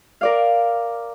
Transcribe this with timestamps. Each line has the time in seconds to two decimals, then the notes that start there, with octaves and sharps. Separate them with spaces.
0.21 A#4 D5 F5